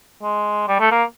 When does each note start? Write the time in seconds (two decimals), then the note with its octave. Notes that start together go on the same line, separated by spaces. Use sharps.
0.22 G#3
0.68 G3
0.80 A3
0.91 A#3